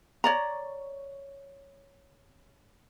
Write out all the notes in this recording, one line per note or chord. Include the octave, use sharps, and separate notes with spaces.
C#5 D5 A#5